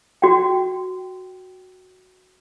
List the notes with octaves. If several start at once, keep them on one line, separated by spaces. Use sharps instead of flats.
F#4 G5